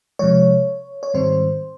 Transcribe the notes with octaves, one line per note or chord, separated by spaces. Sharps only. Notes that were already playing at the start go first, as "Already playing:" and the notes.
C3 F3 G#3 C#5
C#5
G#2 D#3 G3 C4 C5